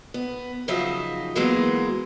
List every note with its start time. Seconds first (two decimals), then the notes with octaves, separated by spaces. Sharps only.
0.14 B3
0.68 C#3 F3 F#3 D#4 D#5 E5
1.35 E3 F#3 G#3 A#3 B3